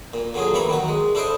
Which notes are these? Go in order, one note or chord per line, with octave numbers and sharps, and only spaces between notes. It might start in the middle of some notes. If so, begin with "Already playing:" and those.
A#2
A#2 D3 F#3 C#4 G#4
A1 A#2 E3 E4 A#5 B5
D#3 F#3 F#4
G#3
D4 E4 A4 C5 D5 D#5